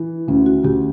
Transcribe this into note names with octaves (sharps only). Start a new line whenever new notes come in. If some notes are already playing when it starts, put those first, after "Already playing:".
Already playing: E3
D2 C#4
F#4
D2 G4